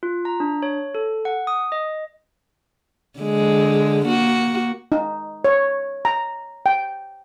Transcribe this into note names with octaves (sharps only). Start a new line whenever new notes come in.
F4
A#5
D4
C#5
A4
F#5
D#6
D#5
D3 G#3
A#3 F#4
D#4
C#5
A#5
G5